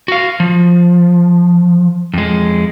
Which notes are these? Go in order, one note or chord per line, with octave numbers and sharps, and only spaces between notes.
F#4 F5
F3
F2 G#3